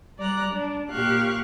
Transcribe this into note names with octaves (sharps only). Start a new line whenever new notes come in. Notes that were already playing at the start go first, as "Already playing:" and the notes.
G3 D5 A#5 F#6
D4
A#2 G4 F5 C#6 F#6